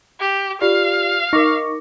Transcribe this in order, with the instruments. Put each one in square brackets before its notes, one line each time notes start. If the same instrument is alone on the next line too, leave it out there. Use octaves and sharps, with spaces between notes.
[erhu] G4
[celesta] F4 G4 D5 [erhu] F5
[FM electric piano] D#4 C#6 [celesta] A#4 D6 A#6